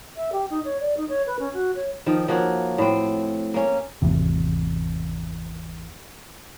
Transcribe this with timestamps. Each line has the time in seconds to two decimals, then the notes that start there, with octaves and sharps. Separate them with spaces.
0.17 E5
0.32 G4
0.50 D#4
0.65 C#5
0.80 D5
0.97 D#4
1.09 C#5
1.26 B4
1.39 C#4
1.53 F#4
1.75 C#5
2.06 D#3 F3
2.28 F3 A#3 F#4 C#5
2.78 A2 C4
3.54 A#3 C#4
4.02 G#1 E2 C3